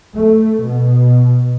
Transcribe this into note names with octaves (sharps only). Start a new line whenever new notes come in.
A3
B2